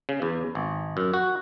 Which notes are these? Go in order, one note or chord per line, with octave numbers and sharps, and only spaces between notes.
C#3
E2
G#1
F#2
F#4